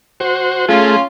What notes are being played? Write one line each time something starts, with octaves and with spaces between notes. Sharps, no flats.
F#4 C5
A3 C#4 F4 G#4